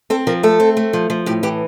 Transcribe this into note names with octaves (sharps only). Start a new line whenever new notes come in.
C4 A4
F3 A#4
A3 A4
C4
A3
F3
F3
A2 G4
E3 G4